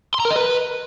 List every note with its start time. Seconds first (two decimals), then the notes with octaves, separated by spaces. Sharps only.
0.14 C6
0.20 A#5
0.25 A#4
0.30 D#5
0.36 B4